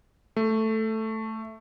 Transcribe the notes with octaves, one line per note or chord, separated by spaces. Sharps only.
A3